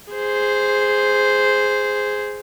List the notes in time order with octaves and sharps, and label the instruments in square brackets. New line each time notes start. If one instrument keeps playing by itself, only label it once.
[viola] G#4 C5